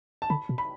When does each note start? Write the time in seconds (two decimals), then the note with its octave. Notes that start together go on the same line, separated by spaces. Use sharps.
0.22 A5
0.30 D3 B5
0.49 B2
0.58 B5